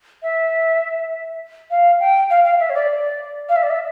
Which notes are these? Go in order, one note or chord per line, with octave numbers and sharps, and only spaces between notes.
E5
F5
G5
F5
F5
E5
C#5
D5
F5
E5
D5
E5